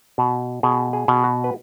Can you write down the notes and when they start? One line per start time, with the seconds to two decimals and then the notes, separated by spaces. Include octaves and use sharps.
0.18 B2
0.63 B2 G#4
0.93 G#4
1.08 B2
1.24 F#4
1.44 B4